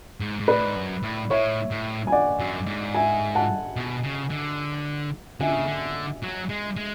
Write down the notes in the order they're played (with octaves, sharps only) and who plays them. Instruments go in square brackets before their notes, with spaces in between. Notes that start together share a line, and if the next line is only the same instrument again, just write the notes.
[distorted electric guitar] G#2
G#2
[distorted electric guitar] A2 [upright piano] B4 D5
[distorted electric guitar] G#2
F#2
A2
[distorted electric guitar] A2 [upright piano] C#5 E5
[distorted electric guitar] A2
[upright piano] G#5
D5 F#5
[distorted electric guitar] F#2
G#2
[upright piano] E5 G#5
F#5 A5
[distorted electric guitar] B2
C#3
D3
[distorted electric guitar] D3 [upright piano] E5 G#5
[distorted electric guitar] C#3
D3
F#3
G#3
G#3